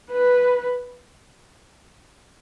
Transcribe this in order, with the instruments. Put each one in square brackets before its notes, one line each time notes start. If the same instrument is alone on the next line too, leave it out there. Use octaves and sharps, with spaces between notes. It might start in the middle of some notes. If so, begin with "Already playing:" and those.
[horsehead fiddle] B4